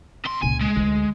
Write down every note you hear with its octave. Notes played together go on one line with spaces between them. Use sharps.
B2 C6
C#2 A#2 G#5
G#3
D2